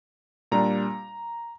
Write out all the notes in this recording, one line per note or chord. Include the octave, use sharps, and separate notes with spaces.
A#2 G3 D4 A#5